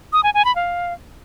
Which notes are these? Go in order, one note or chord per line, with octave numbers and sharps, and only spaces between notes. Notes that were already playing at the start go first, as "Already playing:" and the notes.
D#6
G#5
G#5
B5
F5